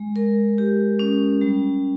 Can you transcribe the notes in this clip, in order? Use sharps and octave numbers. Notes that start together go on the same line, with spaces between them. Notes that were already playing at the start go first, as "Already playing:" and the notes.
Already playing: G#3
A#4
G4
C#4
G3